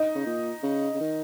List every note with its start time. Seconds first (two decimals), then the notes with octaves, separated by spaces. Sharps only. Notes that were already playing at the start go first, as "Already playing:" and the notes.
Already playing: D#4
0.15 C#3
0.26 A#2
0.63 C#3
0.95 C#3
1.00 D#3